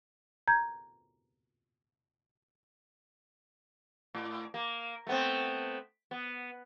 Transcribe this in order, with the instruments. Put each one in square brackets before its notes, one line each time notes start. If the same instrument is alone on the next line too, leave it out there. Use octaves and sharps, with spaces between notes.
[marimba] A#5 G6 G#6
[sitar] A2
A#3
A3 B3 C4
B3